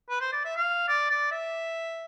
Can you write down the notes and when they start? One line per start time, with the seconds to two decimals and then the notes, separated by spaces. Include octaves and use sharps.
0.10 B4
0.21 C5
0.32 D5
0.45 E5
0.56 F5
0.88 D5
1.10 D5
1.31 E5